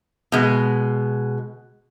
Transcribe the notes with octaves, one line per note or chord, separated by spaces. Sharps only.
B2 G#3